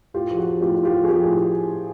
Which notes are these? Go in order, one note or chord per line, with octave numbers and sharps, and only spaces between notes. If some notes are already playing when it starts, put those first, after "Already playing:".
A2 F4 G4
F3
F#4 G#4
F3
A2 F4 G4
A2
F4 G4
F3
G#4
F3 F4 G4
A2